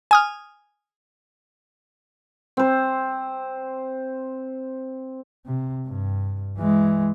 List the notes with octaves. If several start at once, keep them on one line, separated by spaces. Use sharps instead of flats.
G#5 D#6 F6
C4 C5
C3
G2
E3 G#3